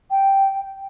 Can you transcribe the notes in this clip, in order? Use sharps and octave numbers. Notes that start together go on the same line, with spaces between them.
G5